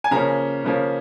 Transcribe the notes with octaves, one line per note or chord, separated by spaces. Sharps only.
G#5
C#3 F3 A#3 C#4 A#5
C#3 F3 A#3 C#4